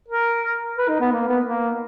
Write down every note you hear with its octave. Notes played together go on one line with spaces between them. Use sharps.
A#4
B4
D#4
B3
A#3
B3
A#3